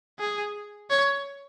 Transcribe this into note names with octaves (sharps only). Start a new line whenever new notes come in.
G#4
C#5